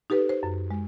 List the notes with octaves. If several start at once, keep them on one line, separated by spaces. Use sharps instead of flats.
D#4 G4 A4 B4
C5
F#2
G#3